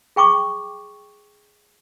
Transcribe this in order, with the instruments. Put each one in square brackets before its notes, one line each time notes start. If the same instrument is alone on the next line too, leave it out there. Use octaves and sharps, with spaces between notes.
[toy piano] G#4 G5 C#6 D6